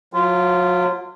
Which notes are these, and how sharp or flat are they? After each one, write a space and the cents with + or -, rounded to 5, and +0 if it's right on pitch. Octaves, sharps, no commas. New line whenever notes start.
F#3 -40 F4 -15